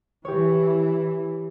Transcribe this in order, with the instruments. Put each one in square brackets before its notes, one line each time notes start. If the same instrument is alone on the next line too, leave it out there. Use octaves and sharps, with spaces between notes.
[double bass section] E3 [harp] G4 C#5